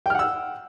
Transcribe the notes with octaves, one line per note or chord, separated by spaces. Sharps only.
F#5 G5 E6 F6